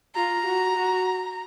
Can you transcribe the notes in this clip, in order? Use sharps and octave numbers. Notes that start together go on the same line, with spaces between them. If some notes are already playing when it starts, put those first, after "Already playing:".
F4 A#5
F#4
F#4